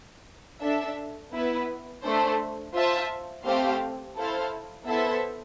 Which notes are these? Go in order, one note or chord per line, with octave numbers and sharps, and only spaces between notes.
D4 A4 E5
B3 E4 B4
A3 D4 A4 C5
F4 C5 E5 A5
A3 C4 G4 C5 F5
E4 A4 C5 F5
B3 E4 A4 C5 E5